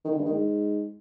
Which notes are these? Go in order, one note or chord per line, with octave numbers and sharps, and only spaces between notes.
D#3
D3
G2
D#3
G#2